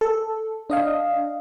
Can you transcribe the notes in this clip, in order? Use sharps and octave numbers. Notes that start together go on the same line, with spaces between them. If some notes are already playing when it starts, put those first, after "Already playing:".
A4
D4 D#5 F5